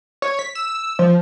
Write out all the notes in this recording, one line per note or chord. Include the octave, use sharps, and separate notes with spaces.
C#5
B6
E6
F3